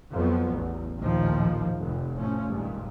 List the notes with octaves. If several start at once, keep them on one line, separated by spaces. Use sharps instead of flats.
F2 F3 F#3 B3
A1 E2
A#1 D#2 A2 D#3 F3
F1
A2 F3 A3 C#4
G#1 G2 A#2